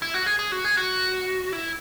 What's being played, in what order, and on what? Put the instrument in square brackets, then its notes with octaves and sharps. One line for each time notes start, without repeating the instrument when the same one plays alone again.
[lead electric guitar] E4
F#4
G#4
G#4
F#4
G#4
F#4
E4